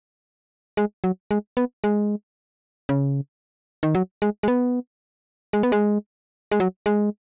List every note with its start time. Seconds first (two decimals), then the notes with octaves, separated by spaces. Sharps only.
0.77 G#3
1.04 F#3
1.31 G#3
1.57 B3
1.84 G#3
2.89 C#3
3.83 D#3
3.95 F#3
4.22 G#3
4.43 G#3
4.48 B3
5.53 G#3
5.63 B3
5.72 G#3
6.52 G#3
6.60 F#3
6.86 G#3